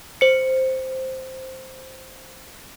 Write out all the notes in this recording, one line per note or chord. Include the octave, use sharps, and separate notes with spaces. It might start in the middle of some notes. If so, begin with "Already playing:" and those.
C5 C#7